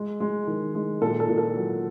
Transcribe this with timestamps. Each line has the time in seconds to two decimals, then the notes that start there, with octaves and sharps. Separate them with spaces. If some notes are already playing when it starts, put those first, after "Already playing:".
Already playing: G#3
0.20 G#3
0.47 D#3
0.75 G#3
1.02 A#2 A4
1.20 A4
1.29 A#2
1.38 A4
1.56 F#3